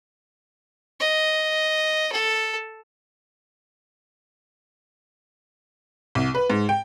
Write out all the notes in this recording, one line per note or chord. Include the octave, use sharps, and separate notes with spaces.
D#5
A4
C2
B4
G#2
G5